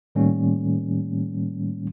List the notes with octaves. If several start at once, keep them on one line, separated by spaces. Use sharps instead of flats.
A2 D#3 G3 A3 A#3 C#4